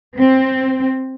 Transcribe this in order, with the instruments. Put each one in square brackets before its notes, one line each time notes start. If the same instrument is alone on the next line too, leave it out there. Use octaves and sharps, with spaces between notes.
[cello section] C4